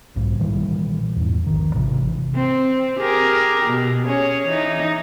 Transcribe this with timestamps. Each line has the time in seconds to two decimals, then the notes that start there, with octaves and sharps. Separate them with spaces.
0.16 B1 G#2
0.39 A#2 D#3 E3 G3
1.16 E2 G#2
1.46 A#1 D#3
1.74 G#1 C3 E3 D4
2.35 C4
2.99 G4 G#4 A#4
3.66 B2
4.06 C#4 G#4 C#5
4.48 E3 D#4